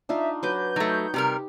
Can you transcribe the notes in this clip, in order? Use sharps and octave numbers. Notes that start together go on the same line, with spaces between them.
D4 D#4 F4 E5
F#3 B4 D6 G6
F#3 A3 D#4
C3 G3 G4 A#4